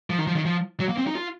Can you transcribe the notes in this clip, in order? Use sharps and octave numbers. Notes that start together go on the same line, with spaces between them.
F3
D#3
F3
D#3
F3
F#3
A#3
C4
D#4
F4